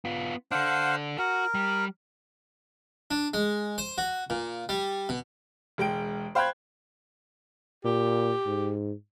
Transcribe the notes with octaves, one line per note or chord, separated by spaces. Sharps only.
B3 F4
D4 A4 C5 F5 F#5
F#4 A#4
G3
D4
G#3
C5
F#4
A#2
G3
B2
E1 G#3 G5 D7
C5 F5 G5 B5 F#6 G#6
A#2 G4
G#2